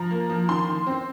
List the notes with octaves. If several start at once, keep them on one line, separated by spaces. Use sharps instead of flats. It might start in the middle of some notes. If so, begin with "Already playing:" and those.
Already playing: F3 A#5
A#3
F3
D#3 C6
D#3
C4